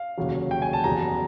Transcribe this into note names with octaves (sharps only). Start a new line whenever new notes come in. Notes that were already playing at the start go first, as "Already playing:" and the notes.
Already playing: F5
F1 D#2 C#3 F#3
G5
G#5
A5
F#1 E2 B2 G3 B3 A#5